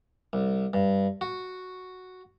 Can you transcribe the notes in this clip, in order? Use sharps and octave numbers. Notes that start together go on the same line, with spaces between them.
C2
G2
F#4